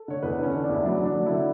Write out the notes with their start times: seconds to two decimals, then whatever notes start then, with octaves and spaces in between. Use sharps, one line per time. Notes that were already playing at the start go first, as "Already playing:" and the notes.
Already playing: A4
0.08 D3 C#5
0.23 E2 B4
0.39 D3 C#4
0.55 D3
0.64 D4
0.69 E2
0.74 E4
0.85 F#3 D4
1.01 D3 D4
1.16 F#3
1.26 D3 E4